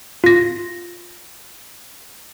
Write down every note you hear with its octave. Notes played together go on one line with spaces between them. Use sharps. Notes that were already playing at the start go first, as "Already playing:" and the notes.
F4 A#6